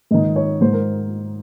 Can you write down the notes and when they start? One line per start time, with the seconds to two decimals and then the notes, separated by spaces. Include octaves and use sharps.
0.11 G#2 D#3 D#5
0.36 C#5
0.61 G#2 D#3 C5
0.73 A#4